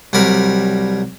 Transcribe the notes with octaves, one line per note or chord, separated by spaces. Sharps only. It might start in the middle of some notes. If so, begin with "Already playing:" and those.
C2 F#3 G3 A#4 B5